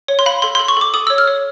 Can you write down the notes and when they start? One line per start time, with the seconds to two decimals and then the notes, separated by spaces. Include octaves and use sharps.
0.08 C#5
0.19 C6
0.26 F5 B5
0.42 A4 C6
0.55 C6
0.59 A4
0.68 C#6
0.77 A4 D6
0.94 A4 D#6
1.07 C#5 E6
1.18 F6
1.28 C#5